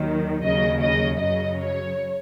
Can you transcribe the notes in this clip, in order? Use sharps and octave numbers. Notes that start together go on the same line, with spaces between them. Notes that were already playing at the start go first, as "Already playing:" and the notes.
Already playing: D#2 D#3 F#3
D#2 C#3 F#3 D#5
D#5
F#2 C#3 F#3 D#5
C#5